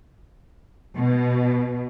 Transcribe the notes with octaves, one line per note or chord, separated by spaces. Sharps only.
B2